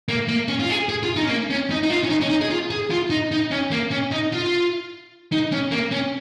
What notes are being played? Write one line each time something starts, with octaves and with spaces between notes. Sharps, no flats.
A#3
A#3
C#4
F4
G#4
G#4
F4
D#4
C#4
A#3
C#4
D#4
D#4
F4
C#4
D#4
C#4
D#4
G#4
F4
G#4
F4
D#4
D#4
C#4
A#3
C#4
D#4
F4
D#4
C#4
A#3
C#4